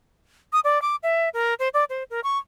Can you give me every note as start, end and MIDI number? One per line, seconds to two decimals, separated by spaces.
0.53 0.60 87
0.64 0.81 74
0.82 0.96 86
1.03 1.29 76
1.34 1.54 70
1.59 1.69 72
1.74 1.84 74
1.90 2.04 72
2.10 2.20 70
2.24 2.38 85